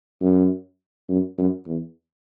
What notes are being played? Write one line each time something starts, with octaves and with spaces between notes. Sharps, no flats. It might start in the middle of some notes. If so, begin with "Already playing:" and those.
F#2
F#2
F#2
E2